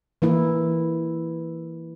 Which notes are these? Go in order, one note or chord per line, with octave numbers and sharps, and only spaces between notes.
E3 A#3 E4